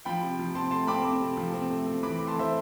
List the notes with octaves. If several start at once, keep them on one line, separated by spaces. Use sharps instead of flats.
F3 G5 B5
C3
F3
C4 A5 C6
A3 A5 C6
C4 B5 D6
C4
C3
F3
C4
A3
C4
E3 B5 D6
A3
A5 C6
E3 C5 E5